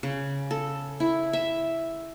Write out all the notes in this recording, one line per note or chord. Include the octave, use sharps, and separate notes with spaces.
C#3
A4
E4
E5